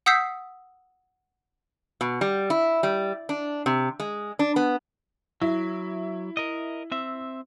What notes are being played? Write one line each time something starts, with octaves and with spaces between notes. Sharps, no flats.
F#5 D#6 E6 G6 B6 C7
B2
G3
E4
G3
D4
C3
G#3
D4
B3
F#3 E4
A#4 D#5
C4 E5